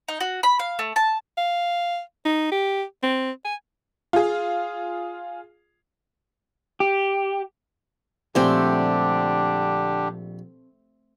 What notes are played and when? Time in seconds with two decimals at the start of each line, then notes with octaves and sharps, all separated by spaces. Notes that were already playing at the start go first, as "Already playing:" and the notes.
0.08 D#4
0.21 F#4
0.43 B5
0.59 F5
0.79 A3
0.96 A5
1.37 F5
2.25 D#4
2.52 G4
3.03 C4
3.45 G#5
4.13 F4 G#4
6.80 G4
8.35 A#1 D3 G3 A3 C4 D4 G4 G#5